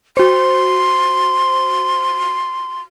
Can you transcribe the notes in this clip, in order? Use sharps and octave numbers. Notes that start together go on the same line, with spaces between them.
F#4 C5 C6